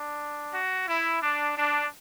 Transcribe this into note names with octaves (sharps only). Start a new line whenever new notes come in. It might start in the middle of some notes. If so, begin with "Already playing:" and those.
Already playing: D4
F#4
E4
D4
D4